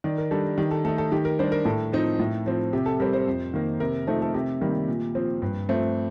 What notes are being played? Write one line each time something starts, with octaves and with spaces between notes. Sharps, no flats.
D#3 D5
A#4
G3 D4 A4
D#3 G4
A4
A3 D#4 A4
A4
D#3 G4
A#4
G3 D4 C5
A#4
A2 A4
F3 C4 D#4
A2
F3 C4
C3 G4
A4
G3 C4 A#4
C5
F2
D#3 A#3
C3 A#4
F3 A3 C4 D#4 A4
A4
C3 G4
D#3 G3 A#3
A#2
F3 C4
G2
F3 A3 C4